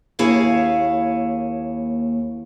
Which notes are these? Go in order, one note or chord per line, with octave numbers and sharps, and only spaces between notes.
D#2 A#3 E4 G#4 C#5 F5